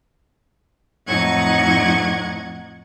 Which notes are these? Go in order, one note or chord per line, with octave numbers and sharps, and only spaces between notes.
F2 A2 D#4 F#5 C#6 G#6